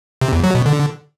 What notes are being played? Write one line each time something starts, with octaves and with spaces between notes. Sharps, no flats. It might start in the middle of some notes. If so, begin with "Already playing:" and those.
C3
E2
F#3
B2
D3